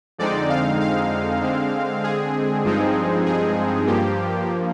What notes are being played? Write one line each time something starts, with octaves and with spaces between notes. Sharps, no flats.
F2 D3 G#3 C4 D#4 D5
F5
F5
D3 G#3 C4
G#4
G2 F3 G#3 C4 D#4
G#4
G2 F3 A#3 G4